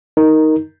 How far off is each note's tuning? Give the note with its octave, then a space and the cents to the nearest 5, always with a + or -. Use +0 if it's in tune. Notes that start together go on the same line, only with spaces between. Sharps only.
D#4 +10 A#4 +0